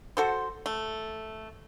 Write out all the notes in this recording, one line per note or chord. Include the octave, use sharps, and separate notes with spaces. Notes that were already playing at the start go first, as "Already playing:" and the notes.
F#4 A4 C5
A3